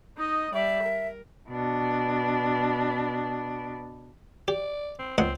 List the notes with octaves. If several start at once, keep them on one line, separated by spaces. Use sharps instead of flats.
D#4 D#5
G3 D5 E5
A#4
B2 D4
G4 D5
C4
C#2 C4 D#5 F#5